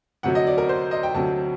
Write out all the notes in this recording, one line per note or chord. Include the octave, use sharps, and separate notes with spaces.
D2 C3 F#3 F#5
D#5
D5
A#4
C5
D#5
G5
D2 C3 F#3 A5